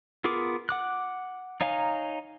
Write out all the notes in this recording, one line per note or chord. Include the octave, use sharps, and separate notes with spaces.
B3 F4 G#4 A#4 D6
F#5 D6 F#6
D#4 C#5 F5 G#5 A#5